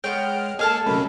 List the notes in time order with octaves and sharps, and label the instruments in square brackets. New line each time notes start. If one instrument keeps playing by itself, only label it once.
[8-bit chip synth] G#3 F6 [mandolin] B3 G5 [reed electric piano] C#5
[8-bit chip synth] A#3 A4 [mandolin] G#4 F5 A5 [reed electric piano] D#5
[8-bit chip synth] C3 F#3 A3 [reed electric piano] C#4 A#4 B5